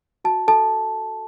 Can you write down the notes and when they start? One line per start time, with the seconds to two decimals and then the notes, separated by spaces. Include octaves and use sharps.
0.24 F#4 A5
0.48 A4 A5